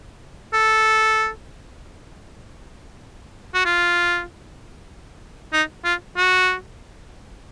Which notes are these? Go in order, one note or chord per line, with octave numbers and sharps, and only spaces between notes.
A4
F#4
F4
D#4
F4
F#4